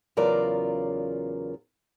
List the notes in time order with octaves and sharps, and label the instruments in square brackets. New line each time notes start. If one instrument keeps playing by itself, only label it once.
[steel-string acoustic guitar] E2 C#3 F#3 F4 A#4 D5